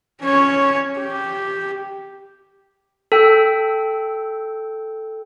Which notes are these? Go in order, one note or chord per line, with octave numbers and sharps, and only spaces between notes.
C#4 C#5
G4
A4 G5 E6 G6